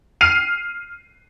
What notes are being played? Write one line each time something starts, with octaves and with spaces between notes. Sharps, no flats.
F6 C7 D#7 F7